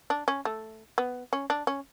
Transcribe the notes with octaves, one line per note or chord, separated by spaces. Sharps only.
D4
C#4
A3
B3
C#4
D4
C#4